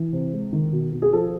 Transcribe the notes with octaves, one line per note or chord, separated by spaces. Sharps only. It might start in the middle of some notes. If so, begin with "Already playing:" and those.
Already playing: E3
C3
G#3
D#3
B2
B2
G#4
F3 A4